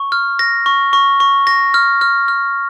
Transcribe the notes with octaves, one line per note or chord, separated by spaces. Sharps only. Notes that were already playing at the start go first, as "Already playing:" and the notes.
Already playing: C#6
F6
A#6
C#6
C#6
C#6
A#6
F6
F6
F6